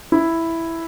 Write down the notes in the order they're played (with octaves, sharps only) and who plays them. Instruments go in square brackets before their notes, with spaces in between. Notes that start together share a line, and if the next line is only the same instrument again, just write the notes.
[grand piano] E4